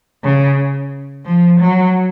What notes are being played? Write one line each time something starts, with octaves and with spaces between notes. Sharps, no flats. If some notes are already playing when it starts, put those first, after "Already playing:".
C#3
F3
F#3